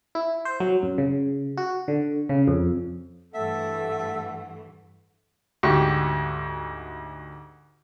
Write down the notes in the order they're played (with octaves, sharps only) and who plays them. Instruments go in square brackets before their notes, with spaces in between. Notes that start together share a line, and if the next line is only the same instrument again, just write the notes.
[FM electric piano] E4
C5
F#3
F#2
C#3
F#4
D3
C#3
F2
[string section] G2 E3 A3 [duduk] A4 [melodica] E5 [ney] F#5
[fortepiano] D2 G#2 F#4 G4 C#6